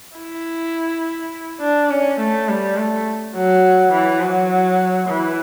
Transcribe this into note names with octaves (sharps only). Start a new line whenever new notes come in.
E4
D4
C#4
A3
G3
A3
F#3
E3
F#3
E3